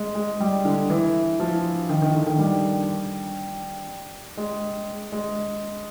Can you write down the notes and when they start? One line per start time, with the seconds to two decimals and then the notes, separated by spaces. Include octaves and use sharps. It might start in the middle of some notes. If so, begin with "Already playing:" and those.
Already playing: G#3
0.15 G#3
0.40 G3
0.65 D3
0.90 E3
1.40 F3
1.89 D#3
2.02 D#3
2.14 D3
2.27 D#3
2.39 G3
4.37 G#3
5.12 G#3